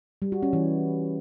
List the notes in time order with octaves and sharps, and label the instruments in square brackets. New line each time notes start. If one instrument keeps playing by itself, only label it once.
[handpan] G3
F#4
C#4
E3